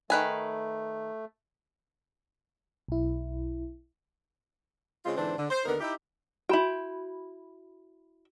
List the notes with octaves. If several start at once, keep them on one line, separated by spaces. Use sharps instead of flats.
D#3 A3 B4 G#5
B1 E4
C#3 G#3 C4 F4
G#2 D3 E3 C4 D4 C5
D3
C5
D#2 D3 B3 D#4 A#4
D#4 E4 G4
E4 F#4 G5 B5